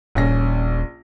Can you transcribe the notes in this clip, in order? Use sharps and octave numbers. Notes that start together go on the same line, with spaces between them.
D#1 A#1 C#4 A#6